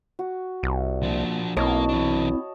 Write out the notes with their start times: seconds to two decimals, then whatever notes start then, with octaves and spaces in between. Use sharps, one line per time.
0.19 F#4
0.63 C2
1.03 F3 A#3 D4
1.57 B1 A#3 C4 E4 C#5 D#5 A5
1.89 E3 D4